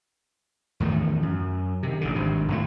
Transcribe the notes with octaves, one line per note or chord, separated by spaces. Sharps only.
E2 A2 D#3 A3
F#2
C3 D#3
A1 D2 D3
G#1 G2 C3
G#1 G2 A#2 A3